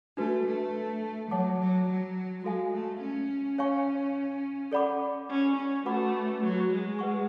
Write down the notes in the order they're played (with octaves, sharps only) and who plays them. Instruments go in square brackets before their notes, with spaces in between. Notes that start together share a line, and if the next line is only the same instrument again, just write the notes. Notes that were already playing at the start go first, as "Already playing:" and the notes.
[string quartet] A3 [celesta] D4 F#4 B4
[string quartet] A3
[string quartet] F#3 [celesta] C#5 F#5 A5 D6
[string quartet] F#3
F#3
[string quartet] G#3 [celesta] F#4 A4 F5 G#5
[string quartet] A3
C#4
[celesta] C#5 F5 G#5 C#6
A4 D5 F#5 B5 D6
[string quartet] C#4
C#4
[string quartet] A3 [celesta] F#4 B4 F#5 B5 D6
[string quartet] F#3
G#3
[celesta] B4 F#5 C#6